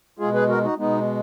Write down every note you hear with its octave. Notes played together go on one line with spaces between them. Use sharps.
B2 G#3 F4 G#4
G#4 B4
F#4 A#4
D#4 F#4
B2 G#3 B3 D#4